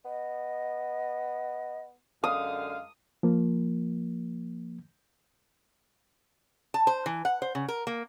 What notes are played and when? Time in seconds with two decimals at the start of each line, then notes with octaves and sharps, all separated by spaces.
0.05 B3 D#5
2.24 F#2 D3 G#3 F5 D#6
3.23 F3 A#3
6.74 A5
6.87 C5
7.06 E3
7.25 F#5
7.42 C5
7.55 C#3
7.68 A#4
7.87 A#3